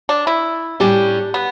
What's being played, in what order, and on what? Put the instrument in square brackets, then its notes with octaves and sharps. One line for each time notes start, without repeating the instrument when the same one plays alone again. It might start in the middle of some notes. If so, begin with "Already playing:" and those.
[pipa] D4
E4
[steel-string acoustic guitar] A2 G3 C#4 G4 [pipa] D4
[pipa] B3